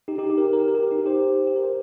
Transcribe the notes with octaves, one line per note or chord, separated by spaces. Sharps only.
D#4 G4
D#4 G4
G4
A#4
G4
A#4
G4
A#4
G4
A#4
D#4 G4
G4 C5
G4
A#4
C5